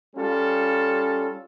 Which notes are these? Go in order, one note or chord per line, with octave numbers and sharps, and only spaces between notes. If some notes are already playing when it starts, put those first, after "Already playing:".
G3 C#4 F4 A4